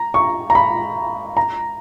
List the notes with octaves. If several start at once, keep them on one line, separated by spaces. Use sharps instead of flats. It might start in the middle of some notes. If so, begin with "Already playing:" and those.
Already playing: A#5
C#6
A#5
B5
A#5